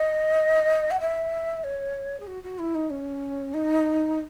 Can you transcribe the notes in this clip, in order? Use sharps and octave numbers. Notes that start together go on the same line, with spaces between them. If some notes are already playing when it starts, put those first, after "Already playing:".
Already playing: D#5
F#5
E5
C#5
G#4
F#4
F#4
E4
D#4
C#4
D#4